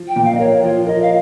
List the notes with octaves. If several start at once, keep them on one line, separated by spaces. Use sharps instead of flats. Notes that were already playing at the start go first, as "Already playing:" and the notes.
Already playing: F3
G5
A#2
F5
D#5
A#4 C#5
F3 F4
A#4 D#5
F5